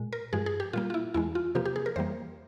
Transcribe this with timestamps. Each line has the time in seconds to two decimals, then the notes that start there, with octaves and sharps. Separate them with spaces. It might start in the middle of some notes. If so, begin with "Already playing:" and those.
Already playing: A#2 G#3
0.13 A#4
0.33 G2 F3 G#3 G#4
0.46 G#4
0.60 G4
0.73 A#2 G3 A#3 F4
0.90 F4
0.94 E4
1.14 E2 E3 G#3 E4
1.35 F4
1.55 C3 F3 A#3 G4
1.65 G4
1.76 G#4
1.86 A#4
1.96 F2 E3 G3 A#3 C5